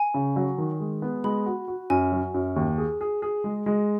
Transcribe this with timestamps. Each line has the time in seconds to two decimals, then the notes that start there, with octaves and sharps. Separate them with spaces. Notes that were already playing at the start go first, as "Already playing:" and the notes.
Already playing: G#5
0.14 C#3
0.36 F#3
0.58 D#3
0.80 G#3
1.02 B3
1.24 G#3 B5
1.46 F#4
1.68 F#4
1.90 F#2 G#5
2.12 F#3
2.34 F#2
2.56 D#2
2.78 G#4
3.01 G#4
3.22 G#4
3.44 G#3
3.66 G#3